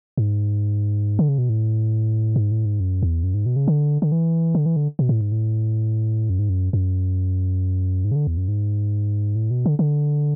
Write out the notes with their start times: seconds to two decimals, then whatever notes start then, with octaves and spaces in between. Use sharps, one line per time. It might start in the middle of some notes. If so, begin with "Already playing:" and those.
0.18 G#2
1.19 D3
1.29 C#3
1.38 B2
1.49 A2
2.36 G#2
2.51 A2
2.65 G#2
2.80 F#2
3.03 E2
3.23 F#2
3.34 G#2
3.46 B2
3.56 C#3
3.68 D3
4.02 D3
4.12 E3
4.55 D3
4.66 E3
4.76 D3
4.99 B2
5.09 A2
5.21 G#2
5.32 A2
6.30 F#2
6.39 G#2
6.49 F#2
6.73 F#2
8.04 G#2
8.11 C#3
8.16 D3
8.27 E2
8.37 F#2
8.48 G#2
9.35 A2
9.51 B2
9.66 D3
9.79 D3